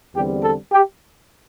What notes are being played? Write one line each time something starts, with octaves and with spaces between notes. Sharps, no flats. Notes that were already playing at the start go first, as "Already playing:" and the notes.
E2 D3 G3 C4 G4
A4
G4